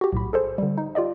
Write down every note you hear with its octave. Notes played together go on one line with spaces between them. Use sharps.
F#4 G4
B1 A2 B5
G#4 A4 C5
D3 G3
D#4
F4 G4 D5 D#5